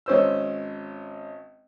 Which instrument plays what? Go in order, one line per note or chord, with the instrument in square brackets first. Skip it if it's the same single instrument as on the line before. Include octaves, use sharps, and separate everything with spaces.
[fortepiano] G#1 C#4 C5 E6